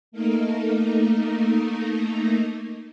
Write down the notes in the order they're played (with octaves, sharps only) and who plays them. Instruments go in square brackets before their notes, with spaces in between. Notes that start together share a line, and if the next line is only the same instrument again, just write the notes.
[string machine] A3 A#3 D#4 A#4